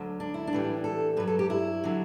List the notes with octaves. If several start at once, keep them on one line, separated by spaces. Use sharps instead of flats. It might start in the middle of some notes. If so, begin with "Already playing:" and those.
Already playing: D2 D3 F#3
D4
E4
D4
A2 E3 G3
A4
G2 F#3 B4
A4
G4
E4
D3 F#3